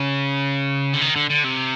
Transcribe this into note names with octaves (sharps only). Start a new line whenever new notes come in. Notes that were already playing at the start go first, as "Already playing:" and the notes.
Already playing: C#3
D3
D#3
D3
D3
C3